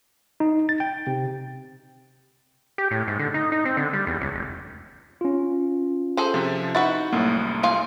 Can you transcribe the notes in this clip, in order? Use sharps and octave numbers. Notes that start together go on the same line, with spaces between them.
D#4
A6
G5
C3
G4
A2
G#2
D3
D#4
D#4
C4
D3
G3
E2
C#2
F1
C#4 F4
G#4 A4 C5
C3 F3
D#4 E4 F#4 B4 F#5 A6
C2 F#2 A2 A#3
F4 G#4 F5